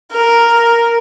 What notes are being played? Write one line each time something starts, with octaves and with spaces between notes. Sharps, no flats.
A#4